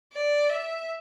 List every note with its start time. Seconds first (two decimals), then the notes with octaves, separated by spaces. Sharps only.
0.13 D5
0.49 E5